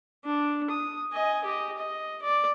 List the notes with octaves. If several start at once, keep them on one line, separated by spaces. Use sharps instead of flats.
D4
D#6
D#5 G#5
G4 D#5
D#5
D5